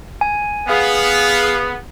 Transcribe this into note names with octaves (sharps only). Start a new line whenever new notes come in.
G#5
B3 G#4 F5